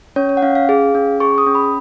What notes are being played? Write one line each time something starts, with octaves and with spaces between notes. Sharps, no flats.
C#4 C#5
C#5
F#5
C#4 F5
F5
G#4
C#4
G#4 C#6
D#6
C#4
B5